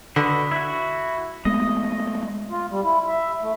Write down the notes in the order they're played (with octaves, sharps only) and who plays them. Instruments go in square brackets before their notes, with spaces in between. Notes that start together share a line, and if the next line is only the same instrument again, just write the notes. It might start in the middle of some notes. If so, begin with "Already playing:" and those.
[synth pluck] D3 [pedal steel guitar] F#4 B4 D#5
[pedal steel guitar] E4 F#4
[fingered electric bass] G#3 A3 B3 [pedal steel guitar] D#5
[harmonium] F4
G3
E4
E5
A3